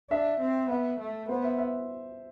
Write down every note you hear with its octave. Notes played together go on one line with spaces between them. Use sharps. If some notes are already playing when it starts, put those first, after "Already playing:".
D4 E5
C4
B3 E5
A3
B3 C5
E5
E5